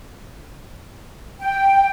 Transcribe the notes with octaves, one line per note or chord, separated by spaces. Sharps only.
G5